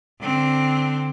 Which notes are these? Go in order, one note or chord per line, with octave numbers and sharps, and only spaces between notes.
D3 C4